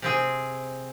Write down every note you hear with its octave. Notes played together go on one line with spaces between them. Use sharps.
C3 C4 G#4